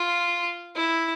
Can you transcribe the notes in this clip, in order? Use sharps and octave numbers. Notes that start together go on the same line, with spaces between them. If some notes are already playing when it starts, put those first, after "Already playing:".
Already playing: F4
E4